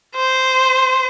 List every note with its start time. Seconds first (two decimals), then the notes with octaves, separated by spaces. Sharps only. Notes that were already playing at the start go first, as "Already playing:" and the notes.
0.15 C5